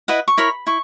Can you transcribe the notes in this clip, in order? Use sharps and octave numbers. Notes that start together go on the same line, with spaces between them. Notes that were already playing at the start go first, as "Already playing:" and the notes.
E4 B4 D#5 F#5
C#6
E4 A#4 C#5 B5
E4 C#6